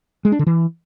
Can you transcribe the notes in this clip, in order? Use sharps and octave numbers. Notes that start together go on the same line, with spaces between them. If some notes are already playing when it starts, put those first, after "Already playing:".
G#3
D4
D3
E3